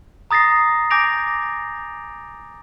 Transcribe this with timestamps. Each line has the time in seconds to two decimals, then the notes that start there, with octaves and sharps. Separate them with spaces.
0.31 A#5 D#6 A6 A#6 C7
0.90 G#5 D6 G6 A#6 D7 F7